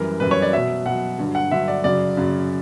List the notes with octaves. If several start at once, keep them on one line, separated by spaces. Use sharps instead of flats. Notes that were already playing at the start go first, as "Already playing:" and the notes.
Already playing: F#2 E3 G3 A#4
F#2 E3 G3 B4
C#5
D5
B2 F#3 E5
B2 F#3 F#5
G2 D3 F#3
F#5
G2 D3 F#3 E5
D5
F#2 C#3 F#3 D5
F#2 C#3 F#3